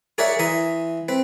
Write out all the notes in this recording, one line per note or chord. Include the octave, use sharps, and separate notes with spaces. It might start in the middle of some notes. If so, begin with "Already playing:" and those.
G#4 A#4 C#5 D5 E5 F#5
E3 E5 A#5 C6 D#6
C4 B4